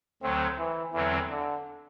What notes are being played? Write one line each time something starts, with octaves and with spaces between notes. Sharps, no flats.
D2 D3 F#3 A3 C4
E3
E2 D3 E3 F#3 C4
D3